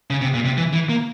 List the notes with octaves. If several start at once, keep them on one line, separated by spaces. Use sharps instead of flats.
C#3
C3
A#2
C3
E3
E3
A#3